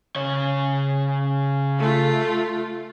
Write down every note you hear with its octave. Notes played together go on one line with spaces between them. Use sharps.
C#3 C#5
A3 F4